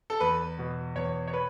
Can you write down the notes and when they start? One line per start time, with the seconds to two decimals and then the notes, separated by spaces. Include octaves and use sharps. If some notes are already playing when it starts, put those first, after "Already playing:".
0.10 A4
0.20 E2 B4
0.58 B2
0.95 E2 C#5
1.28 C#5
1.33 B4